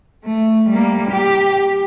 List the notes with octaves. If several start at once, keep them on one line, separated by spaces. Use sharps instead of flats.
A3
G3 A#3
G4